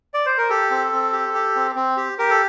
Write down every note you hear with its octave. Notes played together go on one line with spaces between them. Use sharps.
D5
C5
A#4
G4 A4
C4
C4
G4
G4
C4
C4
G4
G4 A#4
A4